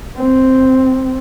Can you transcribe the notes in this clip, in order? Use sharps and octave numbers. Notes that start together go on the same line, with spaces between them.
C4